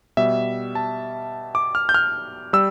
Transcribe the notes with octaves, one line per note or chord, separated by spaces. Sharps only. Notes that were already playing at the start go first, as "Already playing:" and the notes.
B2 G3 E5
A5
D6
F6
G6
F6
G3 E6